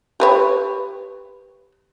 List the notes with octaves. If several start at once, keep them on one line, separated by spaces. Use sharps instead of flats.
G4 B4 C#5